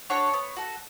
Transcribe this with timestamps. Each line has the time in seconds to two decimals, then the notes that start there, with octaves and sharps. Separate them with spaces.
0.10 D4 F#4 A4 C#5
0.34 B3
0.56 F#4 A4